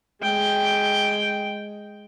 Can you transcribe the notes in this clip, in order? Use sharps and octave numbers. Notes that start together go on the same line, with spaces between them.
G#3 G5